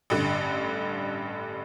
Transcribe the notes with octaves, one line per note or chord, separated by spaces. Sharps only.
A1 G2 D3